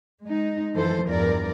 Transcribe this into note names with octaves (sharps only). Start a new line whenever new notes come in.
G#3 D#4
F#2 E3 F3 A4 C5
E2 G2 F3 A#4 D5